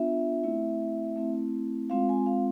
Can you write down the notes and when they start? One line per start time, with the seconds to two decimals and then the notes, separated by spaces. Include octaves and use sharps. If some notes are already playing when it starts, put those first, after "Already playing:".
Already playing: B3 D4 F4 E5
0.43 A3 C4 E4
1.16 A3 C4 E4
1.90 G#3 C4 F4 F5
2.09 G#5
2.26 F5